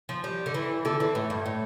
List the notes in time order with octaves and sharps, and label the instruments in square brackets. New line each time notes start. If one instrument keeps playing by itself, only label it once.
[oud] F3
G3
D3
E3
[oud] D3 [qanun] A4
[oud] E3
A2
G2
A2